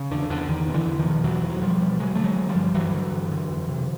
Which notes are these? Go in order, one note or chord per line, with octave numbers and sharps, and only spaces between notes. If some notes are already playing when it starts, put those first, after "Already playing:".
Already playing: C#3
E2 D3
E2 D3
E2 D#3
B2
D3 E3
E2
D#3 F3
B2
E2 E3 F#3
E2
F#3
B2 F3 G3
B2
D3 F#3 G#3
D3 A3
F#3 G#3
D3
F3 G3
G2
G2 E3 F#3
D3
G2
D3
F2
C3